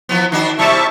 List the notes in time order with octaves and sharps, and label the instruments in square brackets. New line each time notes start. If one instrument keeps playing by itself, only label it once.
[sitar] E3 F3 B3
D#3 D4 F#4
[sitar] C3 G3 E4 [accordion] E5 A5 C#6